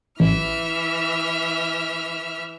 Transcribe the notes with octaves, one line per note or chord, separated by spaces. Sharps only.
A1 E3 E5 F6